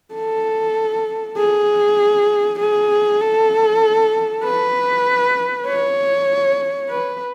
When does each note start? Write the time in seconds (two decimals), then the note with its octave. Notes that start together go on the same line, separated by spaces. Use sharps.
0.14 A4
1.37 G#4
2.59 G#4
3.21 A4
4.44 B4
5.67 C#5
6.89 B4